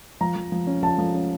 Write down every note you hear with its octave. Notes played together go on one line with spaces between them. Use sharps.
F3 A#5
F3
F3
C#4
F3 A5
F3
C#4